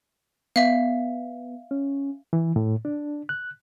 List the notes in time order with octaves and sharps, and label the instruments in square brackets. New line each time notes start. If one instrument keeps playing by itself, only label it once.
[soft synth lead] B3 [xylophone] E5 F5
[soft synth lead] C#4
[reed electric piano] E3
A2
D4
F#6